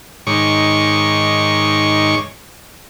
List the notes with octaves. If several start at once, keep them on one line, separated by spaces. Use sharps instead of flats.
G#2 D#3 C#5 C#6 D6